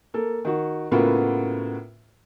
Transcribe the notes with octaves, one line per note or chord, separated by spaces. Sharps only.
A#3 A4
D#3 F#4
A2 C#3 A#3 B3 F4 F#4